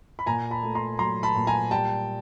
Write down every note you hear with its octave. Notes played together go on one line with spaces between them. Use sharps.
B5
A#2 G#5 A#5
A5 B5
A3
A#5 C6
F#3 A#5 C6
A5 B5
A#2
G#5 A#5
G3 G5 A5